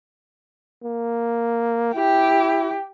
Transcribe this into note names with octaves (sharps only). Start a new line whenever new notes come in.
A#3
E4 G4